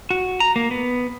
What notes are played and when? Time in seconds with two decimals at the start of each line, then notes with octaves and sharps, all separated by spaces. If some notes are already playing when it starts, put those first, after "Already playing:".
0.10 F#4
0.40 A#5
0.56 A#3
0.71 B3